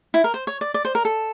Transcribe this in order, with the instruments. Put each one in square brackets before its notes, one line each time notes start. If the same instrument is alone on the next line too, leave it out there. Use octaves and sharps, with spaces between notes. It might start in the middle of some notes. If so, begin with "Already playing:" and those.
[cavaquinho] E4
A#4
C5
C#5
D5
D5
C5
A#4
A4